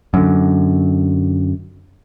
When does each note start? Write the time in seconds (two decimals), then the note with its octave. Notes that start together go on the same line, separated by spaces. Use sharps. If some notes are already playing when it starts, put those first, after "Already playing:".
0.14 F#2 D3